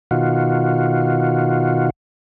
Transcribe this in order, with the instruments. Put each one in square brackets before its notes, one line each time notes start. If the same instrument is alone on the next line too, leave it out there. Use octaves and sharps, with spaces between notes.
[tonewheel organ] B2 D#3 F4 F#4